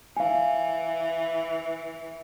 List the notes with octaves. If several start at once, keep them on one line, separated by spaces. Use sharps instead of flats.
E3 F5 G#5